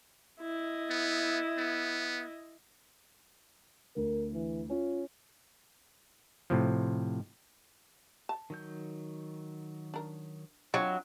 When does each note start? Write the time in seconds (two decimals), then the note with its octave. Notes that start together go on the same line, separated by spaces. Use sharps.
0.41 E4 D#5
0.90 B3
1.58 B3
3.96 D2 A#4
4.33 E3
4.70 C#4 F4
6.50 A2 C3 F3
8.29 A5
8.50 D#3 F#3 G6
9.94 D4 A#4
10.74 F#3 C4 D4 E4 F4 D#5 C#6